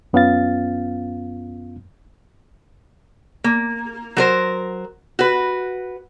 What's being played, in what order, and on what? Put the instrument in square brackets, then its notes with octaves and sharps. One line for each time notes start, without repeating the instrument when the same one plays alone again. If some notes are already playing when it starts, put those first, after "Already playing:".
[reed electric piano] F#2 B3 C#4 F4 F5 A6
[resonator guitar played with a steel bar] A#3
F#3 A#4 C5
F#4 B4